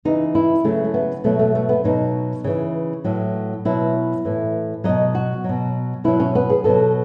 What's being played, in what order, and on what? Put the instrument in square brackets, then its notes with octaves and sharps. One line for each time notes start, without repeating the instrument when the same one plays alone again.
[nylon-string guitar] C#3 E3 D#4
E4
C#3 F#3 A3
A3
B3
B2 F#3 A3
A3
A3
B3
B2 F#3 D#4
C#3 E3
A2 F#3
B2 F#3 E4
A2 E3
B2 F#3 D#5
F#4
B2 F#3
B2 F#3 E4
C#4
B3
G#4
B2 F#3 A4